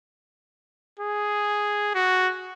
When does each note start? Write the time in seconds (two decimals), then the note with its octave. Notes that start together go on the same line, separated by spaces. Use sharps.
0.99 G#4
1.95 F#4